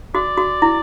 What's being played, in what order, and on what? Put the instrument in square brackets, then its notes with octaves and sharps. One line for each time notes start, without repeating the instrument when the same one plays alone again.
[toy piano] F#4 [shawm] D5
[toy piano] F#4
E4